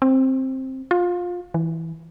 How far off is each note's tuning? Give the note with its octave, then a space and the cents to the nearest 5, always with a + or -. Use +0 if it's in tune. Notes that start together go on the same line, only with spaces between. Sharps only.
C4 +10
F4 +20
E3 -10